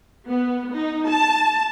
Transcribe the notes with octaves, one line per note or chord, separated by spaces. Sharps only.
B3
D#4
A5